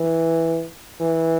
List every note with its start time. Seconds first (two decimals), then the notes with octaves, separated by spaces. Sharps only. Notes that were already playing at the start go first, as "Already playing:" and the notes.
Already playing: E3
1.01 E3